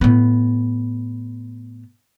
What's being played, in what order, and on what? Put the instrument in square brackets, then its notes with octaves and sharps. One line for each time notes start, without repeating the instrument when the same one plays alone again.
[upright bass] A2 B3